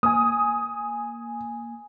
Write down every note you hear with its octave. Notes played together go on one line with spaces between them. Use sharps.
A#3 G#5 D#6